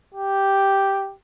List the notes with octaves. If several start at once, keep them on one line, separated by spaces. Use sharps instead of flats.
G4